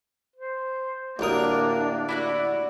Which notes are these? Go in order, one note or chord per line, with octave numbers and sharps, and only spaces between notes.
C5
A1 D2 A#3 D4 A#4 G5 D#6
E4 F#4 D5 F#5